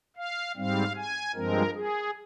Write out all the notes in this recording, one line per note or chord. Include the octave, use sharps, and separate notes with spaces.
F5
G#2 G3 C4 F5
G#5
G2 F3 G#3 C4 A#4
G#4